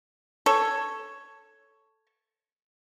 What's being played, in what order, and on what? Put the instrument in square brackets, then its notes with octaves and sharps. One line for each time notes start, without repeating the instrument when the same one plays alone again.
[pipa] A4 C#5